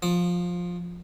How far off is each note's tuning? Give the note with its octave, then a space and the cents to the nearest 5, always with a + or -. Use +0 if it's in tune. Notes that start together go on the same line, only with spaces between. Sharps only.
F3 +15 D#6 -35